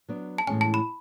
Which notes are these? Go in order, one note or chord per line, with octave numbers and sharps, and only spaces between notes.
F#3 B3 D4
A5
A2 E3 G#3 C#4 G#5
A5
B5